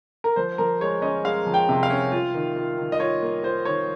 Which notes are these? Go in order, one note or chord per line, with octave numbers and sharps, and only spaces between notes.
A#4
F3 C5
F3 A#4
G#3 C#5
C#4 D#5
G#3 F5
F3
G5
C3
F5
C#4
F4
D#3
F4
D#3
D#5
F4 C#5
A#3
F4 C5
D#3 C#5